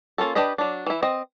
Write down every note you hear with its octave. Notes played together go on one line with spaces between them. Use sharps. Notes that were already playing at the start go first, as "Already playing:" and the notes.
A#3 C#4 F4 A4
D4 G4 B4 D#5 B5
F#3 D4
E3 E4
C4 D#5